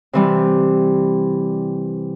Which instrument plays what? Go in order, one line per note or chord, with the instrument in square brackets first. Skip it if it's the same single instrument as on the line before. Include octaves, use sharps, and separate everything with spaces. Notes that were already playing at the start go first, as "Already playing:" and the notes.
[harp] C3 E3 G3